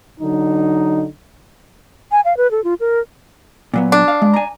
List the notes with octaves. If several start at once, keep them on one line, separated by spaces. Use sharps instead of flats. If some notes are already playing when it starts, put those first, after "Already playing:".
D3 F#3 D#4
G#5
F5
B4
A4
F4
A#4
A#2 F#3 B3
D4
F5
G#3
G#5 A#5